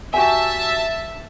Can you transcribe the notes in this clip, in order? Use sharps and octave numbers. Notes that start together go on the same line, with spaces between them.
F#4 G4 E5 G#5 A5